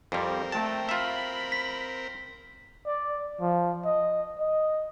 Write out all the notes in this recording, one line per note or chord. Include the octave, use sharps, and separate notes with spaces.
F2 G3 C4 A#4
A3 G5 A5
F4 E5 B5
B6
D5
F3
D#5
D#5